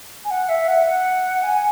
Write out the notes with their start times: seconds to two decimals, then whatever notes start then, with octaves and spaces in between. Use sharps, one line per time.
0.25 G#5
0.30 F#5
0.49 E5
0.68 F#5
0.86 F#5
1.43 G#5